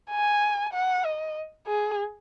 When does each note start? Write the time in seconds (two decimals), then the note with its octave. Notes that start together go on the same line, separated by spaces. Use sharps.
0.11 G#5
0.73 F#5
1.05 D#5
1.67 G#4